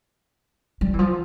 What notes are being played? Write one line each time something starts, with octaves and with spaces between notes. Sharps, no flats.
G3
E3
F3